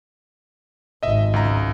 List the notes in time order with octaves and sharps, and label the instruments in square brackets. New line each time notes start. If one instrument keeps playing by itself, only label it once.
[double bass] G#1 [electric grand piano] D#5 E5
[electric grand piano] C#2 A#5